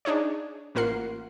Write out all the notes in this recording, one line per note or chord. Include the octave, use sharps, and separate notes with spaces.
D4 D#4 G#4 C#5
A1 A#3 F4 A#4 F#5 C7